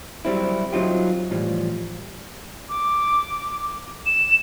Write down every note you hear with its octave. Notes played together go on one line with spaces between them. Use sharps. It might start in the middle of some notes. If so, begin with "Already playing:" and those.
F#3 G3 C4 E4
F#3 C4 D#4 F4 G4
A2 E3 F3 G3
D6
E7